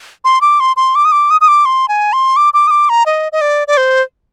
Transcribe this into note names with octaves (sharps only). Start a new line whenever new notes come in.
C6
D6
C6
C6
D6
D#6
D6
D#6
D#6
D6
C6
G#5
C6
D6
D6
D#6
D6
A#5
D#5
D#5
D5
D5
C5